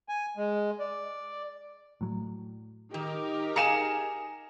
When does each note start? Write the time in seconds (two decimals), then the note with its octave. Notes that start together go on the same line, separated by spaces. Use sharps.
0.09 G#5
0.37 G#3
0.80 D5
2.01 A2 F#3
2.94 D#3 D#4 G4 A#4
3.56 G#4 F5 G#5 A#5 C#7 E7